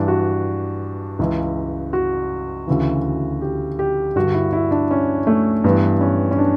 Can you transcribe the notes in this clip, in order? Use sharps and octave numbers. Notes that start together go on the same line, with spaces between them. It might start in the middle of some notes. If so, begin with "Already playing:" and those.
Already playing: G2 E3 D4
F#4
C#2 C#3 E3
F#4
D2 C#3 E3
G4
G4
G2 D3 F#4
E4
E4
D4
C#4
A3
G2 E3 B3
C#4
C#4
D4